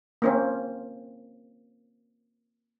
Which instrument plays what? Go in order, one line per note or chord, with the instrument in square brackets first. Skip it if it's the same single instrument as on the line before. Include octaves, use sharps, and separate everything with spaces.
[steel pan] A#3 C4 C#4